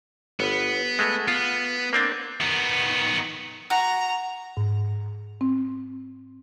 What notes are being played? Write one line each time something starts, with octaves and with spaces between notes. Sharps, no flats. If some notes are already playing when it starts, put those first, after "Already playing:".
G1 B3
G#3 A3
B3 F4
A#3 C4 D4
D#3 B3
F#4 A#5
G#2
C4